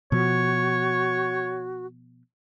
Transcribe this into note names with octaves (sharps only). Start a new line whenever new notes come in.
B2 F3 F#4 C#5